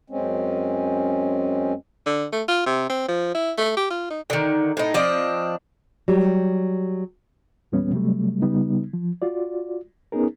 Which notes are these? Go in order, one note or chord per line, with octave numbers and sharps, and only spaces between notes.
F#2 G#3 C4 C#4
D3
A3
F4
C3
C4
F3
E4
A3
G4
F4
D#4
D3 D#3
A2 D#4
F3 C4 D4 D#5
F#3 G3 G4
E2 A#2 G3 B3 C#4
C3 F#3 G3 A3
C#3 G3 B3 D#4
F3
F4 F#4 D5
B3 C#4 D#4 G#4 A#4